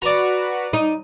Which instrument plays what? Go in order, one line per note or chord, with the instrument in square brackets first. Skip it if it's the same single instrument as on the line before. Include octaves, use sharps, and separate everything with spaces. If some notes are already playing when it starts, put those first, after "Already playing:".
[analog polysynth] F#4 B4 [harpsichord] D5 A#5
[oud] D#4